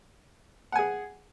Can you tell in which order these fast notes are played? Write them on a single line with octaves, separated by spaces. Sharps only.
F#5 G#5 G#4